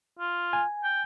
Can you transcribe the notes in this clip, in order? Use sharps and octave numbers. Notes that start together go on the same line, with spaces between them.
F4
G#5
G5